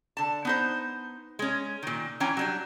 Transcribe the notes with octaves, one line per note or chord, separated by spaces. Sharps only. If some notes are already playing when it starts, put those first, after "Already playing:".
D3 A5
B3 D#4 C5
G#3 C#4
A#2 D#3
E3 C#4 G5 G#5 A#5
F#3 G3 D4